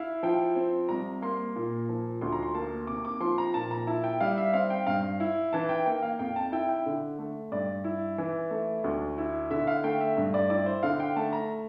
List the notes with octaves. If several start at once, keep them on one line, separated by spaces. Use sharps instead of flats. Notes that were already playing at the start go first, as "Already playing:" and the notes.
Already playing: E4 F5
F3 G5
C4
C2 A#5
A#3 C6
A#2
F3
D2 C6
A#5
C6
A#3 A5
C3 D6
D6
F3 C6
A#5
A#2 A5
A#5
E4 A5
G5
G3 F5
E5
C4 F5
G5
G2 F5
E4
E3 A5
G5
A#3 G5
F5
F2 G5
A5
E4 G5
G5
D3
A3
G2 D5
E4
E3
A3
D2
E4
D3 E5
F5
A3 G5
E5
G2
D5
E4 D5
C5
D3 F5
G5
A3 A5
A#5